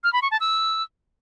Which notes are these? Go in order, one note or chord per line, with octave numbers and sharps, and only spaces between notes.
F6
B5
C#6
A5
E6